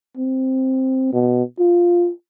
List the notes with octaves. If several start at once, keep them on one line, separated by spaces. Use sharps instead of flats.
C4
B2
F4